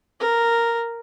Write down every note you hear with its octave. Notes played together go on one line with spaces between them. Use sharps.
A#4